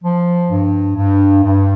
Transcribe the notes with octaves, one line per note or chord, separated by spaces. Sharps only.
F3
G2
G2
G2